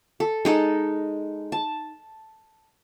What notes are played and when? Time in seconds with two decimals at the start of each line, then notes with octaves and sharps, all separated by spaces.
0.20 A4
0.45 G#3 D#4 A4
1.52 A5